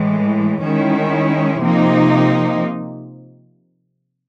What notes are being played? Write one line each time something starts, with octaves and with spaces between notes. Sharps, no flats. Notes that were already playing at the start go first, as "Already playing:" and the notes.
Already playing: A2 E3 G#3
D#3 G#3 C#4 E4
C3 F3 A#3 D#4